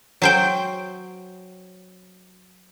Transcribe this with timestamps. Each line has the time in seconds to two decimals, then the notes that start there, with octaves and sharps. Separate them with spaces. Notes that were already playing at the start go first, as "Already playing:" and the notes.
0.22 F#3 C5 G5